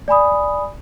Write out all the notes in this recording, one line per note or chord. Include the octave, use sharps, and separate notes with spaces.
D5 G#5 B5 D#6